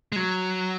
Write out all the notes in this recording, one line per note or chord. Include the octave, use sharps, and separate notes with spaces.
G#3
F#3